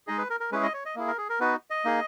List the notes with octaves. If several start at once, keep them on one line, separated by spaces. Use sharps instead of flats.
G#3 D#4 G#4 D#5
B4
A#4
A#4
G#3 C#4 E4 G#4 B4
D#5
C#5
D#5
A#3 E4 G#4
A#4
G#4
A#4
B3 D#4 F#4 B4
D#5
A#3 D#4 G#4